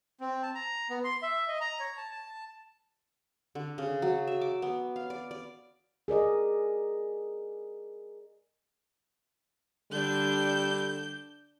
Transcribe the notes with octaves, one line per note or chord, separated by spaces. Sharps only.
C4
A5
A#5
B3
C6
E5
D#5
A#5
C#5
A5
A5
D3
C#3
F#3
E5
D6
B3
F5
D5
D5
G#4 A#4 D5 D#5
D3 G3 D4 G6